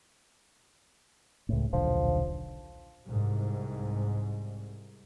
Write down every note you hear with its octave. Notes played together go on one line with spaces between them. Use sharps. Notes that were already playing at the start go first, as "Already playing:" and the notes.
C#2 A2
D#1 B1 D3 F3
C2 G#2